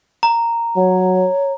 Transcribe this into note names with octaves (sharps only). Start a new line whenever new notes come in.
A#5
F#3 C#5